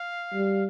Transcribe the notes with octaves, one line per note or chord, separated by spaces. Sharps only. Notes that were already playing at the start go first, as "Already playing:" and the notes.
Already playing: F5
G3